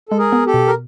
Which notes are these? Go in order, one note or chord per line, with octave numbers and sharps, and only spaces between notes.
G#3 A4
G#4 A#4
B3
G4 A4
B2
A#4